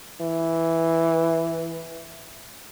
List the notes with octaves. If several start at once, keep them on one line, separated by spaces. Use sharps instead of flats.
E3